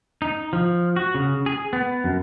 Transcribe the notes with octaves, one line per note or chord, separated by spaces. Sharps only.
D#4
F3
F#4
C#3
G#4
B3
F#2